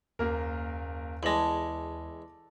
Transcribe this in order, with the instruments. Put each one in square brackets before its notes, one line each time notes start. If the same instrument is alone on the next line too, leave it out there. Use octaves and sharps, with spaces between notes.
[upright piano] F#1 A#3 A#4 [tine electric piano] D#2
[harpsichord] E2 G#3 [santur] A4 D5 A5 [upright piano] A#6 F#7